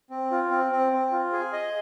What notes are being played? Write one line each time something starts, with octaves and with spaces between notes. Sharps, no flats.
C4
F4
C4
C4
C4
F4
G#4
D#5